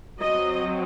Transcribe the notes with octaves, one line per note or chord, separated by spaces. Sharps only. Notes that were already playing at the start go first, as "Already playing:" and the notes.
F#3 C4 D#5